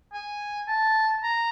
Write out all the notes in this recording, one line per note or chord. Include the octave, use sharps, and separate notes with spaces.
G#5
A5
A#5